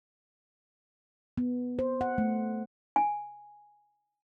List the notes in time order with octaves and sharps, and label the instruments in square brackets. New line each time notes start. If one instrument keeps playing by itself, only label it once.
[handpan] B3
C5
F#5
A3
[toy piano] G#5